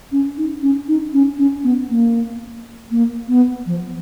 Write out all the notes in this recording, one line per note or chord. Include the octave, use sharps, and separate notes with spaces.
C#4
D#4
C#4
D#4
C#4
C#4
B3
A#3
A#3
B3
F3